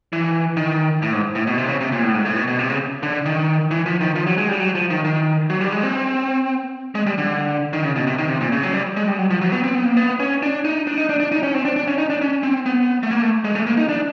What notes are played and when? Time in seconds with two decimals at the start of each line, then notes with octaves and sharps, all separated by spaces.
0.13 E3
0.57 D#3
1.02 A2
1.13 G#2
1.35 A2
1.47 B2
1.57 C3
1.69 C#3
1.81 C3
1.92 A#2
2.03 A2
2.14 G#2
2.25 A2
2.36 B2
2.48 B2
2.59 C3
2.69 C#3
3.03 D3
3.26 D#3
3.71 E3
3.86 F3
4.01 D#3
4.16 F3
4.27 F#3
4.38 G#3
4.49 G3
4.60 F#3
4.75 F3
4.90 D#3
5.04 D#3
5.50 F#3
5.61 G3
5.72 G#3
5.83 C4
6.95 G#3
7.07 G3
7.18 D3
7.73 D#3
7.84 C#3
7.96 B2
8.07 C3
8.18 D#3
8.29 C3
8.41 A#2
8.52 C#3
8.63 F#3
8.74 G3
8.97 G#3
9.07 G3
9.18 F#3
9.30 F3
9.41 F#3
9.52 B3
9.64 C4
9.75 B3
9.86 A#3
9.97 B3
10.20 C#4
10.43 D4
10.65 D#4
10.87 D4
10.97 D#4
11.09 D4
11.20 D4
11.32 D#4
11.43 C#4
11.54 C4
11.65 D4
11.76 D4
11.87 C#4
11.98 D#4
12.10 D4
12.21 C#4
12.43 C4
12.66 B3
13.03 A3
13.11 A#3
13.22 A3
13.44 G#3
13.55 A3
13.67 A#3
13.77 D#4
13.89 D4